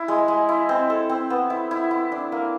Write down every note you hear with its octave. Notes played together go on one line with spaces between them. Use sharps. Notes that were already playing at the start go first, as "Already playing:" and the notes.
Already playing: E4
G#3
G#3
E4
C4
A4
C4
B3
E4
E4
E4
D4
A#3